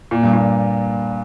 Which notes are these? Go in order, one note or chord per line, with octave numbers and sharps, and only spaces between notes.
A#2
G2
A#2